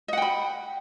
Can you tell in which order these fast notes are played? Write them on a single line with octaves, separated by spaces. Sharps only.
D#5 F#5 G5 B5